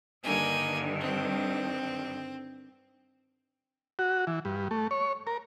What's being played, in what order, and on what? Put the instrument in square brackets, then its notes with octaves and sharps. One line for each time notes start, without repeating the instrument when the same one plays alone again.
[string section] G2 D3 D#3 [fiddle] A#3 G#5
[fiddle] C4
[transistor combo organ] F#4
E3
G2
A3
C#5
A#4